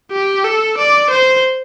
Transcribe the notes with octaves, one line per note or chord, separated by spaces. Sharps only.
G4
A4
D5
C5